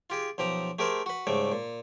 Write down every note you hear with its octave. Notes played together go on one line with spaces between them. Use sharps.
F4 G4 G#4
B1 F3 G4 A#5 D#6
A3 G4 G#4 A#4 C5
F#4 B4
G#2 C#3 G3 A3
A#2